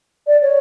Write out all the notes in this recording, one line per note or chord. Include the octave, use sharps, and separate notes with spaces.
D5
C#5